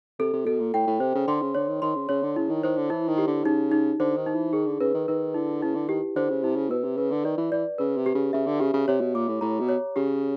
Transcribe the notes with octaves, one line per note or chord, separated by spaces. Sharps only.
C3 A4
C3
B2 A4
A#2
A2 G5
A2
C3 C5
C#3
D3 C6
C#3
D3 C#5
D#3
D#3 C6
C#3
C#3 C#5
D3
C#3 E4
D#3
D#3 C5
D3
E3 E4
D#3
G4
D3
C#3 D#4
D#4
D3 C5
D#3
D#4
E3
D#3 G#4
D3
C#3 B4
D#3
D#3 B4
D3 E4
C#3 E4
D3
D#3 G4
D3 C5
C#3
C3 E4
C#3
B2 B4
C3
C#3 B4
D3
D#3 D5
E3
E3 D5
C#3 B4
C3
G4
C#3
C#3 E5
D3
C#3 G4
C#3
C3 C#5
B2
A#2 D6
A2
A2 A#5
B2
C#5
C#3 G4